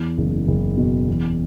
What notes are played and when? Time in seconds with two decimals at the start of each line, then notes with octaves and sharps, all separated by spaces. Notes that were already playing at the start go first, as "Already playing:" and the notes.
Already playing: E2
0.18 F#1
0.48 F#1
0.77 B2
1.08 E2